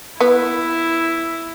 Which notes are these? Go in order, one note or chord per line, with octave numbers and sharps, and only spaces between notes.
B3 E4